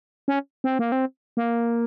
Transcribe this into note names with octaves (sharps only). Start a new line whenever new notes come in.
C#4
C4
A#3
C4
A#3